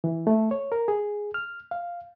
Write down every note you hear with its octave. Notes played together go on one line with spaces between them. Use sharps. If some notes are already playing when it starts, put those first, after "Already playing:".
E3
A3
C#5
A#4
G#4
F6
F5